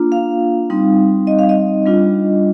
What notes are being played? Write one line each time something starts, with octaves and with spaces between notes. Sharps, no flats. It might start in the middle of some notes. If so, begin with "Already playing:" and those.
Already playing: A#3 D4 F4
F5
G3 C4 D#4
D#5
F5
D#5
G3 D4 F4